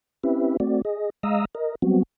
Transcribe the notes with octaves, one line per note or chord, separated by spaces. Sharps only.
C4 C#4 E4 G4 B4 E5
A3 C4 F#4 D5
G#4 D#5
G#3 D#5 F5 A#5 D#6 E6
A#4 D#5
F#3 G3 B3 C4 F#4